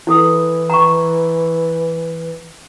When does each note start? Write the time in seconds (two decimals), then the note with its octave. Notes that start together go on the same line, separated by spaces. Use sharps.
0.07 E3 E4 A4 D#6
0.70 A#5 C#6